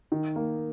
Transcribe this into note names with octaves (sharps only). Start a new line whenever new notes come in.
D#3
A#3